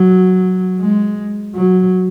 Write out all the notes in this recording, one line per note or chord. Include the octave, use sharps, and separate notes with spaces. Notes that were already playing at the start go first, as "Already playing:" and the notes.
Already playing: F#3
G#3
F#3